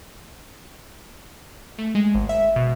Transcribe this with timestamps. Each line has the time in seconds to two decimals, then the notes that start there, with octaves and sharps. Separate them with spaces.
1.78 A3
1.95 G#3
2.14 G#1
2.29 E5
2.56 B2